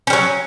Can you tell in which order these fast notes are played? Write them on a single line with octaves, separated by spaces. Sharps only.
C#4 G3 F#3